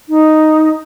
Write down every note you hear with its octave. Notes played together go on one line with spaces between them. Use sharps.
D#4